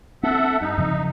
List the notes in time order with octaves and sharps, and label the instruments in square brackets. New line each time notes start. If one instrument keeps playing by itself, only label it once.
[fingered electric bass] B3 C4 [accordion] A4 E5 F#5
[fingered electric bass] G2 [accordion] D#4
[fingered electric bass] F#2 C#3 F3